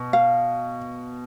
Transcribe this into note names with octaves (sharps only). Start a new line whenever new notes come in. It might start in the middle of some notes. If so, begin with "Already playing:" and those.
Already playing: B2
F5